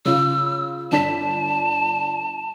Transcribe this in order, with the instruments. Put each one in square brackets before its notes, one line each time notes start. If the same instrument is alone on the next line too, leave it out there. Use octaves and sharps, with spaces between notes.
[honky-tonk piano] C#3 F4 [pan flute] E6
[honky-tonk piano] G1 D4 B6 [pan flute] A5